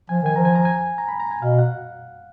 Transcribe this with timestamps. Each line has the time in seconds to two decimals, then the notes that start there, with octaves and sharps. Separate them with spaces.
0.09 F3 G#5
0.22 D#3 G#5
0.36 F3 A#5
0.45 G#5
0.55 A#5
0.65 G#5
0.98 A#5
1.08 B5
1.20 A#5
1.31 G#5
1.41 B2 F5
1.58 F#5